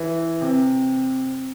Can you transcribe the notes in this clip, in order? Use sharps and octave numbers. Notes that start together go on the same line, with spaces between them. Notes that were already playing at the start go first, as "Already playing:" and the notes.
Already playing: E3
C3